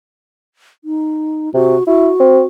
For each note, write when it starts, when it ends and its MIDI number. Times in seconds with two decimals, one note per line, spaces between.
0.84 1.53 63
1.54 1.76 48
1.54 1.84 66
1.87 2.09 64
1.87 2.46 66
2.20 2.41 60